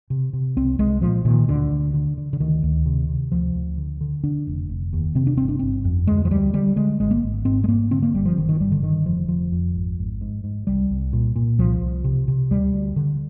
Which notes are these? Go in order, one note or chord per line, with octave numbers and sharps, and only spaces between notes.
C3
C3
C2 C4
C2 G#3
A#2 F3
A#2 D#3
D2 D3
D2
D3
D3
D3
D2 D#3
D2
C3
C3
D2 F3
D2
D3
D3
D3 D4
F1
F1
D#2
C3 C4
D4
G1 C4
D4
G1 C4
F2
D2 G#3
F3
D2 G3
D3 G3
D3 G#3
G#1 G#3
A#3
G#1
G#2 C4
G#3
G#2 A#3
D3 C4
A#3
G1 G3
F3
G1 D#3
D#3
G2 G3
D3
D3 D#3
F1 F3
F1 F3
F2
G#1
G#1
G#2
G#2
C2 G3
C2
A#2
A#2
C2 F3
C2
C3
C3
D2 G3
D2
D3